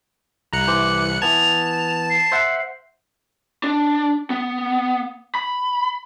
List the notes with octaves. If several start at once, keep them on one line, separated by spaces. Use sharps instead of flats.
C2 A#5 F#6 C#7
E3 C5 D6
E3 B3 A5 G#6 F7
C7
C5 E5 F#5
D4
B3
B5